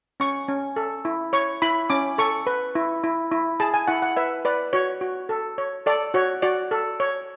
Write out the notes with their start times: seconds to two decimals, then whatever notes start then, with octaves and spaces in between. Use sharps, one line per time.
0.20 C#4 C#6
0.48 C#4
0.76 A4
1.05 E4
1.33 C#5 C#6
1.62 E4 B5
1.90 C#4 D6
2.18 A4 C#6
2.47 B4
2.75 E4
3.04 E4
3.32 E4
3.60 G#4 A5
3.74 G#5
3.87 E4 F#5
4.02 F#5
4.16 B4 E5
4.45 B4 D5
4.73 F#4 C#5
5.01 F#4
5.29 A4
5.58 C#5
5.86 A4 D5
6.14 F#4 C#5
6.42 F#4 D5
6.71 A4
7.00 C#5